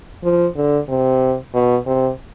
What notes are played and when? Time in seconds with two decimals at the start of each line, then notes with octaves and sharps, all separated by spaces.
0.23 F3
0.56 D3
0.89 C3
1.54 B2
1.86 C3